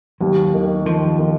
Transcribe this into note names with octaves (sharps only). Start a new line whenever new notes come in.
D#2 F#3
D#3
D#3 F3
D#3